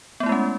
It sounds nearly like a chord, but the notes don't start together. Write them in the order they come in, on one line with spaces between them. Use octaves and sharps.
B3 A3 E4 G#3 C#4